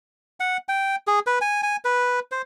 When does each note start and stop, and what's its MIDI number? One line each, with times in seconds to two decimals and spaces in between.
0.40 0.57 78
0.69 0.96 79
1.07 1.19 68
1.27 1.39 71
1.41 1.61 80
1.63 1.76 80
1.85 2.20 71
2.32 2.42 72